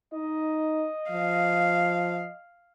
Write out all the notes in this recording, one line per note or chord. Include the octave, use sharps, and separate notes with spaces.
D#4 D#5
F3 F5